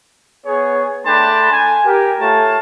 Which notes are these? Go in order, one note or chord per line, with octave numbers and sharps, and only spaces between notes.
B3 G#4 C#5
A3 D4 G5 A5 B5 C6
G#5
G4 A#4
A3 F4 C#5 A5